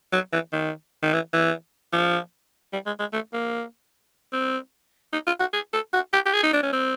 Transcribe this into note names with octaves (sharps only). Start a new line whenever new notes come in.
F#3
E3
D#3
D#3
E3
E3
F3
G3
G#3
G#3
A3
A#3
C4
D#4
F4
F#4
G#4
A4
F#4
G4
G4
G#4
D#4
D4
C#4
C4